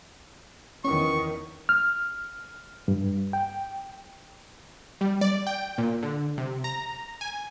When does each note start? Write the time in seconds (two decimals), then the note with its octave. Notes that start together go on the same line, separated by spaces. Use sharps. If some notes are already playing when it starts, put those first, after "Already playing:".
0.84 E2 D#3 C#4 C#6
1.69 F6
2.88 G2
3.33 G5
5.01 G3
5.21 D5
5.47 G5
5.78 A#2
6.03 D3
6.38 C3
6.64 A#5
7.21 G#5